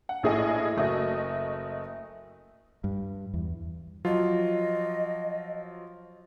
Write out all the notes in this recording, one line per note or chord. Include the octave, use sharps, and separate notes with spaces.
F#5
A#1 A2 G#4 A4 D#5
F#1 A3 F#4 D#5
G2
E2
F3 F#3 F4 D#5